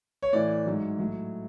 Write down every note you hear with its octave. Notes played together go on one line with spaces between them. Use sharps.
C#5
A2 E3 D5
G#2 F#3
A2 F#3